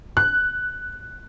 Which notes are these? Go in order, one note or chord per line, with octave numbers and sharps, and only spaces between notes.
F#6